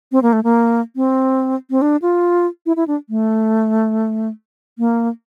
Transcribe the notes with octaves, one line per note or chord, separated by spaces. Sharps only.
C4
A#3
A3
A#3
C4
C4
D4
F4
E4
E4
D4
A3
A#3